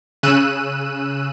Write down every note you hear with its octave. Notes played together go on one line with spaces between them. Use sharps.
C#3 E6 F#6 D#7